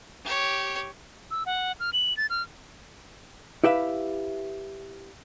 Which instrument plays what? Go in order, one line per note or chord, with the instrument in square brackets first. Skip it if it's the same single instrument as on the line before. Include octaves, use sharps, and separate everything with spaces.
[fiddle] G4 C#5
[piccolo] E6
F#5
F6
F#7
A6
F6
[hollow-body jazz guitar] E4 G4 B4 E5 F5